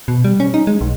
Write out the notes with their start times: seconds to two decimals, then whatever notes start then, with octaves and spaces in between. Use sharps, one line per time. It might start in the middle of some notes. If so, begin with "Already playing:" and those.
0.08 B2
0.24 G3
0.40 C#4
0.54 D#4
0.67 G#3
0.81 B1